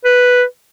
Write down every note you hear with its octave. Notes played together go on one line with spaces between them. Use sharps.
B4